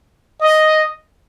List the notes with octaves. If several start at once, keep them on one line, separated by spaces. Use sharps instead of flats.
D#5